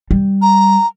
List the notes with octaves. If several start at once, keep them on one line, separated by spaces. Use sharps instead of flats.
G3
A#5